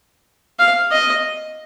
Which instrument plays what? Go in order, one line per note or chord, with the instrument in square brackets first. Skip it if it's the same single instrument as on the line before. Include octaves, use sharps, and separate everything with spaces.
[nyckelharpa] F5
D#5